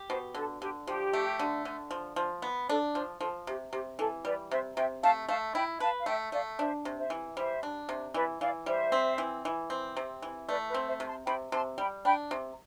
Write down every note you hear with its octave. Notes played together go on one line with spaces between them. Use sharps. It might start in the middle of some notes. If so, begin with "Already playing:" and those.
Already playing: G4
B2 C5
D3 A4
D3 G4
F3 G4
A3
D3
D3
F3
F3
B3
D4 A4
F3 C5
F3 A4
C3 G4
C3 G4
E3 A4
G3 B4 D5
C3 C5 E5
C3 E5 G5
A3 F5 A5
A3 F5 A5
E4 G5 B5
B4 F5 A5
F5
A3 E5 G5
A3 D5 F5
D4 C5 E5
C3
C5 E5
E3
G3 C5 E5
D4
C3
E3 B4 D5
E3 D5 F5
G3 C5 E5
C4
E3
E3
C4
C3
E3
A3 B4 D5
B4
C4
C5 E5
C3
A5 C6
C3 G5 B5
C3 A5 C6
G3 G5 B5
D4 G5 B5
C3